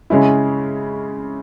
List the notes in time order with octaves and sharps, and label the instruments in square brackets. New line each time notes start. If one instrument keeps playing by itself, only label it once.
[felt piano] C#3 G#3 C#4 E4